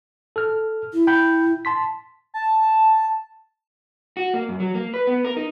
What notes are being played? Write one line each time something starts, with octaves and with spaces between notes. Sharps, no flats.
A4 F6
E4
G5 B5 G6
A5 C6 B6
A5
F#4
A#3
F#2
F#3
A#3
B4
B3
A#4
D#4